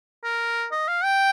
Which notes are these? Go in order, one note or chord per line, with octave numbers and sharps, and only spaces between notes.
A#4
D#5
F5
G5